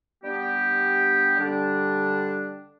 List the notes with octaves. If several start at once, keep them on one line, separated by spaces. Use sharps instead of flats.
G3 B3 D4 G4
D3 G3 D4 G4 D5